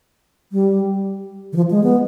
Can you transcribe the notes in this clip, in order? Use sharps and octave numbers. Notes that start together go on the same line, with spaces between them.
G3
D#3
F3
G#3
B3